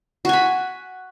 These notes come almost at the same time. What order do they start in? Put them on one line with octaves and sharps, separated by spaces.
F#4 G#5 B5